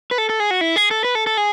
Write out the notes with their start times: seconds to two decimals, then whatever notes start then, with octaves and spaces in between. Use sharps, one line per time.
0.11 B4
0.18 A4
0.29 A4
0.40 G#4
0.51 F#4
0.61 E4
0.76 G#4
0.91 A4
1.04 B4
1.15 A4
1.27 A4
1.37 G#4